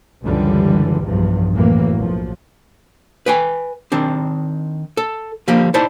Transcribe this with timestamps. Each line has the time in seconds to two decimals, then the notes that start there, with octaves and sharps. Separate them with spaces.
0.23 C#2 F#2 D3 E3 G3
1.02 B1 E2 G2 F3
1.53 F#2 A2 E3 F#3 A#3
1.96 B1 F3
3.26 B4 G5 G#5
3.92 D#3 C4 D4
4.97 A4
5.48 D3 F3 G3 A#3
5.74 D#4 E4 C5 D5 A5